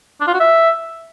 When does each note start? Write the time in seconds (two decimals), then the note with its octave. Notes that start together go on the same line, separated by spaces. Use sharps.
0.21 D4
0.27 F4
0.34 F#4
0.40 E5